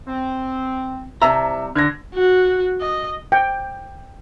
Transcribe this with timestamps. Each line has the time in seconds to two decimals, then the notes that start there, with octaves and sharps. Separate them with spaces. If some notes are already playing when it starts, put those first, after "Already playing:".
0.08 C4
1.22 C2 C3 E5 A5 A#5 E6
1.75 D3 G#6 A#6
2.14 F#4
2.81 D#5
3.32 G5